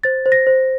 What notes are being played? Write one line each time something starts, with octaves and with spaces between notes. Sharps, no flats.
C5 A6
C5
A#6
C5